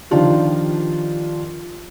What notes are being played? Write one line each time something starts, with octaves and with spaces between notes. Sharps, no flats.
D#3 F3 D4 F4 G4